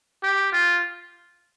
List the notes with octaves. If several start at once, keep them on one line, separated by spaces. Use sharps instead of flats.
G4
F4